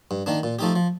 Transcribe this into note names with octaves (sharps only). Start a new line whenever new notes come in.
G2
D#3 A#3 D4
A#2
F3 A3 D#4 G4
F3